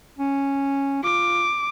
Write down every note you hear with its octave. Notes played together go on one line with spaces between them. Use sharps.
C#4
F4 D6